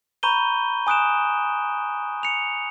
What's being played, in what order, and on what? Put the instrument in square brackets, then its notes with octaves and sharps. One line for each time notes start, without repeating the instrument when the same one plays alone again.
[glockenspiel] A#5 B5 C#6 G6 D#7 G7
G#5 D#6 F#6 D7 E7
C#7 F7